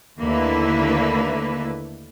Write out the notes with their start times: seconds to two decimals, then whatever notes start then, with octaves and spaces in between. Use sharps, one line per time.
0.20 D#2 D3 A3 A#3 E4 B4